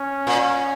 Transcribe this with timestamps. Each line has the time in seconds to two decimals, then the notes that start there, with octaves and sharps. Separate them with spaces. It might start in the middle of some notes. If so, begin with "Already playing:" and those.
Already playing: C#4
0.27 A#2